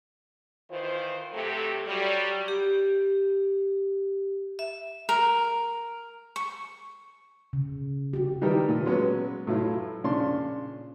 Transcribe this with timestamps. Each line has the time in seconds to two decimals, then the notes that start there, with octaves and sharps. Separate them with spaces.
0.70 D#3 E3 F4 C5
1.33 C3 F#3 A3 G4 A4
1.87 F#3 G3
2.48 G4
4.59 E5
5.09 A#4
6.36 C#6
7.53 C#3
8.13 F#4 G4
8.41 D#3 E3 G3 D#4 G4 A#4
8.68 A#2 D#3
8.85 F#3 G#3 B3 C#4
9.47 A2 F#3 E4 F4
10.04 A#2 C#3 F3 D4 C6